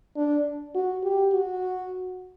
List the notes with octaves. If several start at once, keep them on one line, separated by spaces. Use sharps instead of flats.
D4
F#4
G4
F#4